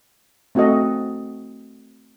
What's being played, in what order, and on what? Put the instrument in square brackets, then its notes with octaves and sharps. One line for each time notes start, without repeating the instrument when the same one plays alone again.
[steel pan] A3 C4 F#4 A4 D#5